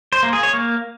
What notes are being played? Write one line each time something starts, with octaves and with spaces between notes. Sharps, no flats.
C5
A#3
G#4
C#5
A#3